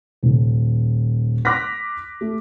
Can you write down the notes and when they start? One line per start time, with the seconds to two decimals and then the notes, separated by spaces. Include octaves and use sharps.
0.23 D#1
1.45 C6 D6 F6 F#6 A#6 B6
2.21 A3